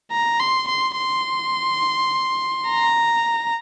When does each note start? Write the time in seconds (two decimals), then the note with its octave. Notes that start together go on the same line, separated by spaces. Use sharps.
0.11 A#5
0.40 C6
0.68 C6
0.97 C6
2.68 A#5